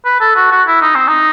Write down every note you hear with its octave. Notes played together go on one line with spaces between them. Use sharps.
B4
A4
F#4
F#4
E4
D#4
C4
D#4